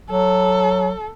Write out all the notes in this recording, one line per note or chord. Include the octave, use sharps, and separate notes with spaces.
F#3 A4